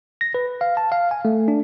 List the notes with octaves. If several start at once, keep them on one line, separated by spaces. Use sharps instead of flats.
A#6
B4
F5
A5
F5
G#5
A3
D4